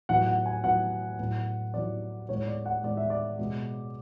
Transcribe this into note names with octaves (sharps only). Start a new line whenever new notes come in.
A2 F#3 B3 F#5
F#5
G#5
A2 F#3 B3 F#5
A2 F#3 B3
A2 F#3 B3 D5
A2 G#3 B3 C#5
D5
F#5
A2 G#3 B3 D5
E5
D5
B2 G#3 B3